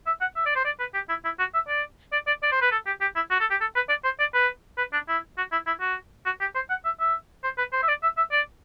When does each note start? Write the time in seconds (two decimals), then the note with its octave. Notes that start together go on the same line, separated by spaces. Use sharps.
0.06 E5
0.21 F#5
0.36 E5
0.46 D5
0.56 C5
0.65 D5
0.80 B4
0.94 G4
1.09 E4
1.25 E4
1.39 F#4
1.54 E5
1.68 D5
2.12 D5
2.27 D5
2.43 D5
2.52 C5
2.62 B4
2.71 A4
2.86 G4
3.01 G4
3.16 E4
3.31 F#4
3.40 A4
3.51 G4
3.60 A4
3.75 B4
3.89 D5
4.04 C5
4.19 D5
4.34 B4
4.78 B4
4.93 D4
5.08 E4
5.38 F#4
5.52 E4
5.67 E4
5.81 F#4
6.26 F#4
6.41 G4
6.55 C5
6.70 F#5
6.85 E5
7.00 E5
7.44 C5
7.58 B4
7.73 C5
7.83 E5
7.88 D5
8.03 E5
8.17 E5
8.32 D5